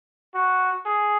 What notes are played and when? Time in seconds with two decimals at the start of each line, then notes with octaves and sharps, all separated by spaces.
0.35 F#4
0.86 G#4